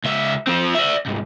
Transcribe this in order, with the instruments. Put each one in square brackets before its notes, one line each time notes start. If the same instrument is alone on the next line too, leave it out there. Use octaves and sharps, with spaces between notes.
[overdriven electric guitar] C#2 E5
F3 C4
D5 E5
C2 G#2